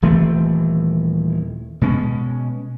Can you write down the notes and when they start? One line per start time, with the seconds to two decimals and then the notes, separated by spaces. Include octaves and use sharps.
0.02 D#1 E3 A3 C4
1.81 B2 G#3 C#4